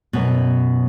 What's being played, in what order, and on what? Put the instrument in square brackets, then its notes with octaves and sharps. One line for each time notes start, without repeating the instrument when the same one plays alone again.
[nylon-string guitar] F#2 B2